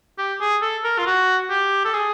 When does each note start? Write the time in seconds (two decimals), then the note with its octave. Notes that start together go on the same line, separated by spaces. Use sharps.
0.18 G4
0.41 G#4
0.62 A4
0.84 A#4
0.98 F4
1.07 F#4
1.50 G4
1.85 A4
1.94 G#4